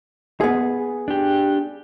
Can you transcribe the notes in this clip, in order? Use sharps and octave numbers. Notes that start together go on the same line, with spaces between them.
B3 G#4
D4 G4